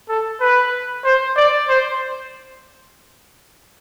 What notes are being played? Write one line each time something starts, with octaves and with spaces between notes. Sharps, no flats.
A4
B4
C5
D5
C5